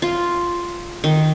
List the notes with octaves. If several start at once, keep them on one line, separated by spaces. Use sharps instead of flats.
F4
D#3